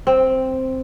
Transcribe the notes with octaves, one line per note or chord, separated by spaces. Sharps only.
C4